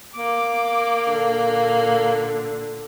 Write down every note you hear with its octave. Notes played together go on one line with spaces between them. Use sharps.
A#3 D6
A#2 D3